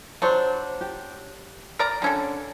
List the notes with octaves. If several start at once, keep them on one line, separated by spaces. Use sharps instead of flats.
F#3 D4 C5 C#5
G4
A#4 D5 A#5
D3 C#4 D4 A4 A5